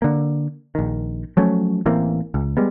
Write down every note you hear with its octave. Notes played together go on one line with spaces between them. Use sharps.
D3 A#3
A#1 D#3
F3 F#3 A3 C#4
A1 E3 A#3 C4
C#2
G3 G#3 B3